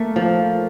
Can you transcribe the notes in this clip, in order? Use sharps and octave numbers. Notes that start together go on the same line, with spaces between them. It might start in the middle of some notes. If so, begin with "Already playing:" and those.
Already playing: A3 A#3 A#4
F3